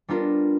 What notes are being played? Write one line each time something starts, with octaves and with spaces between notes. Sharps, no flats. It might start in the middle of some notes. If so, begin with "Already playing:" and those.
G3 B3 D4 F4 A#4